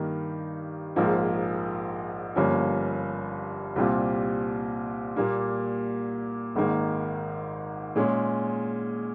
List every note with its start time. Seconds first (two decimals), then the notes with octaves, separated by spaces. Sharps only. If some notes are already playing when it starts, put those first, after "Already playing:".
Already playing: G2 D#3 A#3 D#4
0.96 A#1 G#2 F3 A#3
2.36 G1 G2 F3 A#3 C#4
3.76 C2 A#2 G3 C4 F4
5.16 A#2 G3 A#3
6.55 G#1 G#2 D#3 A#3
7.96 A#2 G#3 C#4 G#4